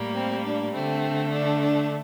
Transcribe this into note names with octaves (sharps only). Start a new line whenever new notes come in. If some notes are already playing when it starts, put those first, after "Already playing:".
Already playing: A2 G3 A#3
C4
D4
D3 A3 C4
D4
D4